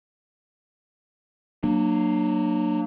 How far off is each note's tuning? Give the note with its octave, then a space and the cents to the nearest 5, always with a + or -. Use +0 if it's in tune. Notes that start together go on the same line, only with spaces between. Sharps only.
F#3 +0 A#3 +0 D4 +35